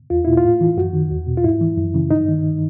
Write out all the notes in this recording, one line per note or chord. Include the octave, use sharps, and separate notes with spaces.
E2 F4
B2 E4
F4
A2
E3
F#2 F#4
D#3
E2
B2
F4
G#2 E4
E3
F#2
C#3 E3
G2 D#4
D#3